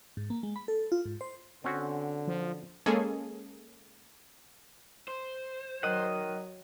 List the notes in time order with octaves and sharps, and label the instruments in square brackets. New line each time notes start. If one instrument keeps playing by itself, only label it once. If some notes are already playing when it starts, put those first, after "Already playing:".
[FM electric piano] G#2
A#3
G#3
B5
A4
F4
G#2
C5
[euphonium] D3 [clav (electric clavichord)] C4 C#4 F#4
[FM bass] F3
[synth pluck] G#3 A#3 C#4 G#4 A4 G#5
[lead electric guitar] C5
[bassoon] D#3 [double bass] F#3 [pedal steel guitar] D#5 F#5